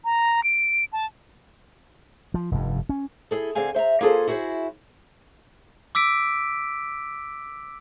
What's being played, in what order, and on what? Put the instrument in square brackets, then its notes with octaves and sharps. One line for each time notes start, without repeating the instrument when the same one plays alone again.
[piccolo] A#5
D7
A5
[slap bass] F3
F1 G2
C#4
[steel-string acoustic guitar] E4 G#4 A4
D3 C4 G#4 F5 G#5
C5 E5 A5 A#5
A#3 F4 G#4 A4 C5
E4 F#4 G#4 B4 C5
[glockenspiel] D6 E6 B6 D7